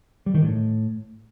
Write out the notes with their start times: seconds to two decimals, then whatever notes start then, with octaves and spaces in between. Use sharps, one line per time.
0.26 G3
0.34 D#3
0.43 A2